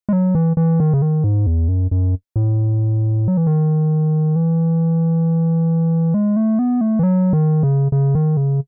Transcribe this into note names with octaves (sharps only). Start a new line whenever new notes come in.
G#3
F#3
E3
E3
D#3
C#3
D#3
G#2
E2
F#2
F#2
A2
F#3
E3
D#3
E3
G#3
A3
B3
A3
E3
F#3
D#3
C#3
C#3
D#3
C#3